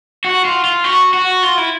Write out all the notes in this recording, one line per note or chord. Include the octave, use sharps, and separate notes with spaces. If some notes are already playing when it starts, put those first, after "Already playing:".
F#4
F4
F4
F#4
F#4
F4
E4